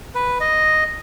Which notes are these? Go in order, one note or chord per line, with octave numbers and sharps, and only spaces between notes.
B4
D#5